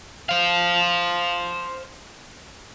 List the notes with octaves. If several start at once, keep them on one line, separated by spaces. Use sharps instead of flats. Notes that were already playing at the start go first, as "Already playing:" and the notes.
C5 F5